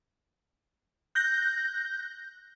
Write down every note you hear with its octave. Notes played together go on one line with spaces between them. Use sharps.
F#6 G6 A#6